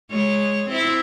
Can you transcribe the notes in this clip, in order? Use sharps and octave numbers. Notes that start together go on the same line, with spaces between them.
G#3 C#5
C4 E4